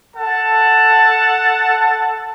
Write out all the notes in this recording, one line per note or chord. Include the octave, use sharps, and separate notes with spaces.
A4 F#5 A5